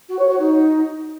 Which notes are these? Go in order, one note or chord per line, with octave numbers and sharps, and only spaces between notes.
F#4
C#5
F#4
D#4